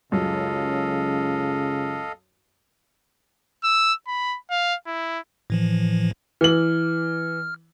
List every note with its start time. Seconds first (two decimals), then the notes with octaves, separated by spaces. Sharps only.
0.12 C#2 F#2 C#3 A4 D#5 F5
3.63 E6
4.07 B5
4.50 F5
4.87 E4
5.50 A2 E3 F3
6.41 E3 F6 F#7